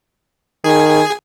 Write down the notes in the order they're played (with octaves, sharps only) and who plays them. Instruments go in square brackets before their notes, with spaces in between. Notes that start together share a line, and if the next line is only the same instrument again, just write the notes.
[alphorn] D#3 [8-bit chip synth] G#4 G#5